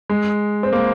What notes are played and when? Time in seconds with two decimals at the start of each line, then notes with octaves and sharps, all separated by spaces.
0.10 G#3
0.63 C4
0.73 A#3